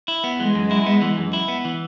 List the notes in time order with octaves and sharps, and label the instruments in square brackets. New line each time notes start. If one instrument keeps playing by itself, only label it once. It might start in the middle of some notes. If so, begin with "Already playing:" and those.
[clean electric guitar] E4
B3
[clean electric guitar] E3 [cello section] G#3
[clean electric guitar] F#2
E4
B3
E3
F#2
E4
B3
E3